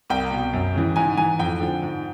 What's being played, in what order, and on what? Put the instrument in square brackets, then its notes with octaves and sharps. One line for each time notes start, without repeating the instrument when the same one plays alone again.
[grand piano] C2 G5
B2
F#2
C#3 E3
G#2 G#5
E3 G#5
F2 G5
D3 F3
G#2